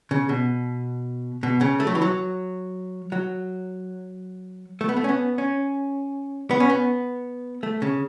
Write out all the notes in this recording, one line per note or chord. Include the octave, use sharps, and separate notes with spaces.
C#3
B2
B2
C#3
A3
F#3
E3
F#3
F#3
A3
B3
A3
C#4
B3
C#4
B3
C#4
B3
A3
C#3